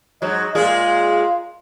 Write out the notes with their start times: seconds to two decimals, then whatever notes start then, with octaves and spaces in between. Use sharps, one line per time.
0.22 G#2 F#3 D#5
0.55 A#2 G#3 F4 G#4